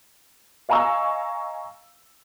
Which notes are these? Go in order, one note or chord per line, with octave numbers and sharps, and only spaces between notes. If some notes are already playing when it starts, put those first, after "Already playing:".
D#5 F5 G#5 A#5 C#6 E6